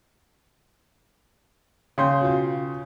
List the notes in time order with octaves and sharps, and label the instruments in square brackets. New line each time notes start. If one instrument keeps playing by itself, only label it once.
[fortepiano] C#3 [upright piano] G5 C6 G6
[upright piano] B2 F4